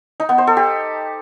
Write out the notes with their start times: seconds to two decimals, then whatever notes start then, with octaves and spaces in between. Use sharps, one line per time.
0.20 D#4
0.29 B3
0.38 C5
0.47 A4
0.57 G4